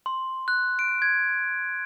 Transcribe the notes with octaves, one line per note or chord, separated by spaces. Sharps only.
C6
F#6
D7
G#6